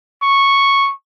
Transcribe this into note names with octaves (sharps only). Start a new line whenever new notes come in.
C#6